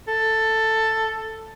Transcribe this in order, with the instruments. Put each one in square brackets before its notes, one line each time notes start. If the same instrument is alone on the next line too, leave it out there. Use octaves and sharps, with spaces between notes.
[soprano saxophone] A4